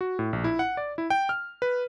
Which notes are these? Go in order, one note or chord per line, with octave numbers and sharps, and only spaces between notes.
F#4
A2
A#1
E4
F#5
D5
E4
G5
F6
B4